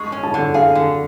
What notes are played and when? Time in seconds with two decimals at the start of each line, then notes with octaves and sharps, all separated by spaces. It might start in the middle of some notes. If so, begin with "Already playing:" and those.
Already playing: G#3 C#6
0.12 C#4
0.23 A5
0.34 D3
0.54 G#4 F5
0.75 D3